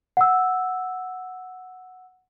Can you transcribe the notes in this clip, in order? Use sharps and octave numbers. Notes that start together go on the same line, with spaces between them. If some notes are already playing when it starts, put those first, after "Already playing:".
F#5 E6